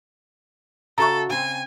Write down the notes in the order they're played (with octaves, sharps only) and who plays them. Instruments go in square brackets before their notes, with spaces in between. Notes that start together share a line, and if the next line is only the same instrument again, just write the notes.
[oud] C#3 F#4 E5 [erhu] A4 [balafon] A#5 C#6
[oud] C#3 C4 [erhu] G#5